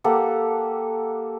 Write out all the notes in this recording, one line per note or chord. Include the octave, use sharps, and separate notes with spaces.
A#3 G4 A4 F#5